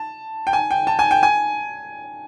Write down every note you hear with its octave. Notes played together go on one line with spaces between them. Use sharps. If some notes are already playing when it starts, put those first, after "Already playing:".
Already playing: A5
G5
G#5
G5
A5
G#5
G5
G#5